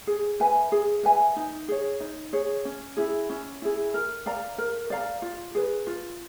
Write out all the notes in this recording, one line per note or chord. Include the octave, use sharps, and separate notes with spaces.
G#4
B4 E5 G#5
G#4
B4 E5 G#5
D#4
G#4 C#5
D#4
G#4 C#5
C#4
E4 G#4
C#4
E4 G#4
A#4
D5 F5 A#5
A#4
D5 F5 A#5
F4
G#4 B4
F4